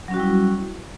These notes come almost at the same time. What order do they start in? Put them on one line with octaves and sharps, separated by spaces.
F#3 C#4 F#4 G3 E4